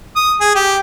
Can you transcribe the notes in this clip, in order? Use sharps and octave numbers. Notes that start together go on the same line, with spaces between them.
D#6
G#4
G4